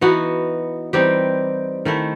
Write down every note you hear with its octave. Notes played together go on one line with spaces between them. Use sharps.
E3 B3 D#4 F#4
E3 G3 C4 D#4 G4
D#3 A3 E4